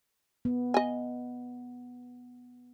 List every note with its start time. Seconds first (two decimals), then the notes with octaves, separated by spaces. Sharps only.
0.45 B3
0.74 D#5 G#5